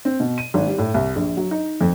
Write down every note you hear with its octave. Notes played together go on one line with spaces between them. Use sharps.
C4
B2
D#7
G#1
G3
A2
C2
A#1
F#3
D#4
F2